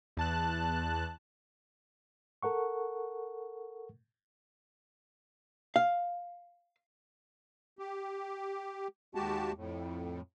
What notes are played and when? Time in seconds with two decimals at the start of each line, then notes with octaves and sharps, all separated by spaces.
0.17 E2 A5 F#6
2.43 A4 A#4 F#5 C#6
5.76 F5
7.79 G4
9.15 D#2 G#3 F#4 G4 A5
9.56 F2 A2